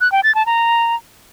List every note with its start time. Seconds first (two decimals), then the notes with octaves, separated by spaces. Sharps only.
0.01 F#6
0.12 G5
0.23 A6
0.35 A5
0.46 A#5